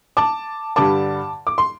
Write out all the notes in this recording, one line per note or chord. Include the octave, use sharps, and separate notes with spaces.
A5 D6
G2 D3 G3 A5 D6
D6
C6